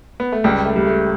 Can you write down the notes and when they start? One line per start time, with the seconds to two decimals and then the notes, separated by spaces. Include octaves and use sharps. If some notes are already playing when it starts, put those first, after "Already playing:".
0.20 B3
0.32 A3
0.44 C#2 G3
0.65 A3
0.76 G3
0.86 A3